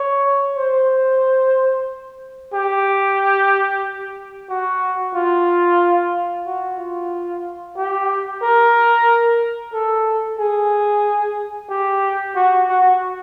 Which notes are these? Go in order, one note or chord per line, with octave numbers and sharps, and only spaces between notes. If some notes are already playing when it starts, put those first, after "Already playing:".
Already playing: C#5
C5
G4
F#4
F4
F#4
F4
G4
A#4
A4
G#4
G4
F#4
F#4